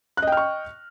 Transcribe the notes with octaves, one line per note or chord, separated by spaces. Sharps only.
D#5 G5 C#6 F6 F#6